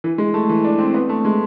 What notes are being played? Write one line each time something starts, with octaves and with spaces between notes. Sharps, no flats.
E3
G#3
A3
E3
D4
C4
B3
A3
G#3